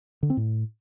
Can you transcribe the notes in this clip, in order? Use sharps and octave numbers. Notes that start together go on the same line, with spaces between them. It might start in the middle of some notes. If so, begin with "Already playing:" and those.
D3
C4
A2